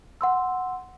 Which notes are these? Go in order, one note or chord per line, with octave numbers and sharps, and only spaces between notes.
F#5 C6 E6